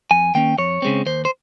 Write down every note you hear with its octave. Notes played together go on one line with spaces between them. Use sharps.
F2 G#5
D#3 A#3 C#4 G5
F2 C#5
C#3 G#3 C4
D#2 C5
C5